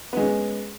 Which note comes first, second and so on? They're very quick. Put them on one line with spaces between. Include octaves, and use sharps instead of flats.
B3 G#3 C#4